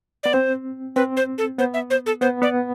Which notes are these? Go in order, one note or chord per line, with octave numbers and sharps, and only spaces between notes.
B3 D5
C4 C5
C4 B4
C5
A4
B3 C5
E5
C5
A4
B3 C5
B3 D5